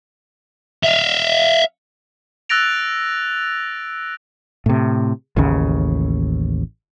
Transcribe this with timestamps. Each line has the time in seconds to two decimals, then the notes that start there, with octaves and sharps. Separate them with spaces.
0.83 E5 F5
2.49 E6 F#6 A6 A#6 D7 F7
4.66 A2 C3
5.37 A1 D#2 C#3